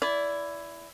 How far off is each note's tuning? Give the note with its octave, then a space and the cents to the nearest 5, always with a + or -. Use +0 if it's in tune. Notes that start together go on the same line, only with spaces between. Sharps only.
E4 +10 D5 -25